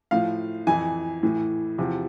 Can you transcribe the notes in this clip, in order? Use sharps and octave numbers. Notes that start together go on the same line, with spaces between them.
A2 F3 F5
F2 E3 G#5
A2 E3
E2 C3 F3